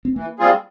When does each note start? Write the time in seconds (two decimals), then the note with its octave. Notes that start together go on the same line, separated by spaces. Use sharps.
0.05 C4
0.16 E3 A#3
0.39 G3 C4 F4 G#4